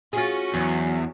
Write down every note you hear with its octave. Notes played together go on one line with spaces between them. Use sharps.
C#4 F4 F#4 G#4
E2 F#3